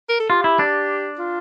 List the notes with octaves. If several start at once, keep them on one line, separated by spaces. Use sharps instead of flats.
A#4
A4
F4 G4
E4
D4
F4